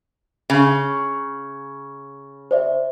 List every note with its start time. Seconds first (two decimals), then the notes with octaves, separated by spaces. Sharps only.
0.50 C#3
2.51 C5 D5 E5